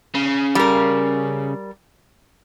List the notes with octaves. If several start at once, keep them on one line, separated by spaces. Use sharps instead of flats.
C#3
G3 A#4